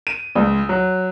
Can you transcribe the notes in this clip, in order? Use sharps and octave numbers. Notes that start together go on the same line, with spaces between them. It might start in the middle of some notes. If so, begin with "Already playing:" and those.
D#7
C#2
F#3